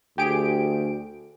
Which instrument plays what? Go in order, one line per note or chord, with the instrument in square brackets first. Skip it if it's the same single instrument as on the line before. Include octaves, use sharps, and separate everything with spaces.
[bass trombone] D2 [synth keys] G4 G#4 D7